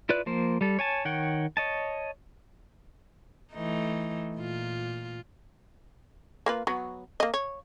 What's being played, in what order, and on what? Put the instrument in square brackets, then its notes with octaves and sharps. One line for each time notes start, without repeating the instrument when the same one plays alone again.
[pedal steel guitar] E4 F4 B4 D5 F#6
F3 A#3 C5
G3 A4
C#5 G#5 A5
D#3 C#5 F#5 G5
C#5 D#5 A5
[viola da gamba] E3 A3 D#4
A#2 F4
[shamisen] A#3 F4 B4
F#3 B3
A#3 D#5
C#5